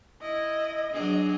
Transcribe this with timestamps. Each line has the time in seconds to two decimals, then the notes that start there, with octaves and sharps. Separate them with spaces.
0.22 E4 D#5
0.93 F#3 D4 G#4